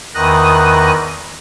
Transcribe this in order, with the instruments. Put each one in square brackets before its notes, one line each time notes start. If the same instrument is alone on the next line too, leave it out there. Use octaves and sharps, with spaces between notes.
[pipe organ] E2 D#3 D#6 F#6 A#6